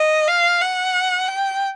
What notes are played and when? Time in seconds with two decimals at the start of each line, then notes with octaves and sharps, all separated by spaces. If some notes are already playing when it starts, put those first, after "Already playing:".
Already playing: D#5
0.28 F5
0.61 F#5
1.28 G5